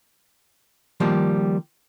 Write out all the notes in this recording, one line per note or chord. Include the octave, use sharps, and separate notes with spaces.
D#3 F3 G3 A#3